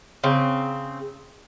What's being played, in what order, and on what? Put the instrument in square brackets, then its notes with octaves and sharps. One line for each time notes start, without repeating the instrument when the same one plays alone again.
[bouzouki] C#3 C4